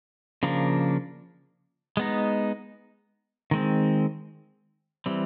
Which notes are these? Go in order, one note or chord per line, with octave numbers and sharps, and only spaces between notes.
C#3 F3 A#3 D4
G#3 B3 D#4
D#3 G#3 C4
E3 G3 C4